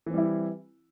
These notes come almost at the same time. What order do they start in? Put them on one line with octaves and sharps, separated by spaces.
E3 C4 G3 E4